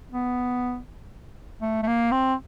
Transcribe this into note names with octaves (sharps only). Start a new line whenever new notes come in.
B3
A3
A3
A#3
C4